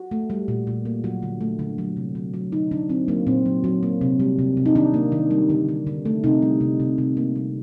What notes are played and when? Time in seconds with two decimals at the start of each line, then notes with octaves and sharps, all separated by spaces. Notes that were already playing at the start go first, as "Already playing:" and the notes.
Already playing: F#4
0.11 A3
0.30 G3
0.48 A#2
0.67 A#2
0.85 A#3
1.04 F#3 F#4
1.23 D3
1.41 A3
1.59 D3
1.78 F#3
1.97 C3
2.15 F#3
2.34 F#3
2.52 D3 D#4
2.71 D3 D4
2.89 F#3 C4
3.08 F#3 A#3
3.27 A#2 C4
3.46 F#3
3.64 F#3
3.83 A#3
4.01 C3
4.20 G3
4.39 C3
4.57 C3
4.66 D#4
4.75 D#3 D4
4.94 A#3
5.12 D#3
5.31 G3
5.50 D3
5.69 D3
5.87 D3
6.05 A3
6.24 C3 D#4
6.42 G3
6.61 C3
6.80 C3
6.98 C3
7.17 A#3
7.35 G3